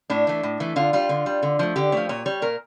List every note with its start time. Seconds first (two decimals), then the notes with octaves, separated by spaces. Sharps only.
0.10 A2 D4
0.27 E3 A3
0.43 A2
0.60 E3 A3
0.76 D3 F4
0.93 G3 F4
1.09 D3
1.26 G3
1.43 D3
1.59 F3 A3
1.76 D3 G4
1.92 F3 A3 C#5
2.09 A#2 C#5
2.26 G3 C#5
2.42 A#2 A#4